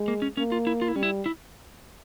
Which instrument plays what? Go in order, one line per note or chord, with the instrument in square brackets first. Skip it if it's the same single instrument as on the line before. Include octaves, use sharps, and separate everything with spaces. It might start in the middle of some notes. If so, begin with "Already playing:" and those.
Already playing: [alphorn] G#3
[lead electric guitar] A#3
C#4
[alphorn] A#3 [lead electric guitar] C#4
[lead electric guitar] F4
E4
F4
E4
[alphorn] G3 [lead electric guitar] C#4
[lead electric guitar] E4
E4